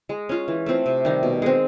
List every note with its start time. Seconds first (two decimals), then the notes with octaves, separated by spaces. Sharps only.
0.09 G#3
0.29 C#4 F4
0.48 E3
0.66 A3 C4 F4
0.86 C3
1.05 D#3 G3
1.23 B2
1.42 G#3 C4